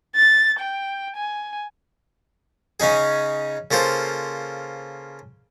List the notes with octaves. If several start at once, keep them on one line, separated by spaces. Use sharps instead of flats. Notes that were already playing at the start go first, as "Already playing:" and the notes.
A6
G5
G#5
C#3 C#4 D#4 G#4
C#3 A#3 F4 A4 C5